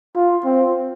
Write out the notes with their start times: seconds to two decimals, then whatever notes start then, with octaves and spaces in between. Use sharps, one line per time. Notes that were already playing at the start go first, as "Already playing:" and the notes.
0.15 F4
0.44 C4